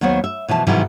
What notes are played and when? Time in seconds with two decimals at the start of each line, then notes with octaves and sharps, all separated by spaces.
0.01 D#2 F#3 B3 C5 C#5
0.24 E5
0.48 B2 E3 F3 A5
0.67 G#2 C3 D#3 E3 F#3 G3